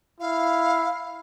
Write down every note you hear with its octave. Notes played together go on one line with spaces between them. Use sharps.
E4 F5